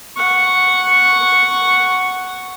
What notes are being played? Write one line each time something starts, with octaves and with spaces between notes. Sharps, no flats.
F#5 C#6